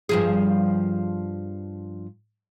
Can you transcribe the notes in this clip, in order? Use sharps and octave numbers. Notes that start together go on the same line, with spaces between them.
G2 F3 G#4